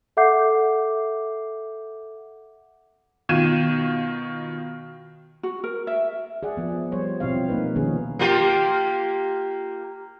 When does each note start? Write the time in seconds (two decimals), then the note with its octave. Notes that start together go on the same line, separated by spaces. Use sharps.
0.17 A4 E5 F#5 D6 G6 C7
3.29 B2 D#3 F4 G#6 D#7 E7
5.43 F#4
5.64 A#4
5.87 E5
6.43 G#4 D5 F#5
6.57 F3 B3
6.92 G3 C5 C#5
7.20 B2 F3 C4 E4 C#5 F5
7.49 A#3 D#4 B4
7.76 B2 D#3 F3 B3 C#4 G#4
8.19 A#3 F4 G4